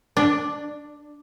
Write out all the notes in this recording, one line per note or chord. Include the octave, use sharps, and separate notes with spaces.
D4